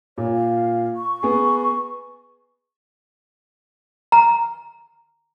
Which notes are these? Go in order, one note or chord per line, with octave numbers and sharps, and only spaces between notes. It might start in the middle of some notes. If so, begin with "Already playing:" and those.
A#2 C#5
F5
C#6
B3 G#4
A#5